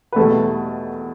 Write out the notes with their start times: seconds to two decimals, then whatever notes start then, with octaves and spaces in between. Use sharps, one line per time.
0.13 B4
0.16 E2 B2 G3 A3 A4